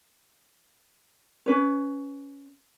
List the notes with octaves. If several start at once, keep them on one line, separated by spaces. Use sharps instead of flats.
C#4 B4 C#5